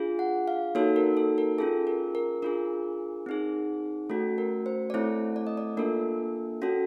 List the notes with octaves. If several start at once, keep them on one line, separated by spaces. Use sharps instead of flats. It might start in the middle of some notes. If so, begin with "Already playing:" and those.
Already playing: D4 F4 G#4
F#5
F5
A#3 D#4 F#4 A4 C#5
A#4
A4
A#4
C#4 F4 G#4 A4
A#4
A#4
D4 F4 G#4 A#4
C4 D#4 G#4
A3 C#4 F#4 A4
A#4
C5
D5
A3 C4 E4 A4 C#5
D5
D#5
D5
A#3 D4 F4 A4 A#4
C#4 F#4 A4